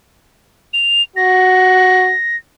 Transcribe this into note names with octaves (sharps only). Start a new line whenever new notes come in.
F7
F#4 A#6